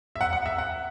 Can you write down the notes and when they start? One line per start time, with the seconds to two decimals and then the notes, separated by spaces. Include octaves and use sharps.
0.16 E5
0.21 F#5
0.33 F#5
0.46 E5
0.58 F#5